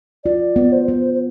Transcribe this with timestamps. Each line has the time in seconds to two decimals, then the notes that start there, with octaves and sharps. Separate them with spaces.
0.24 F4 D5
0.56 B3
0.72 C5
0.88 B3
1.14 C5